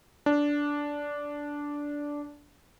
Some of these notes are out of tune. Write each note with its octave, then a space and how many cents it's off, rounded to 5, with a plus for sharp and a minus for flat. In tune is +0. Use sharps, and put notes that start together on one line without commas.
D4 -10